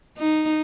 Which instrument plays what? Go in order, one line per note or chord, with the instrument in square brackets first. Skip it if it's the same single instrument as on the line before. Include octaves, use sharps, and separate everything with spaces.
[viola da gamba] D#4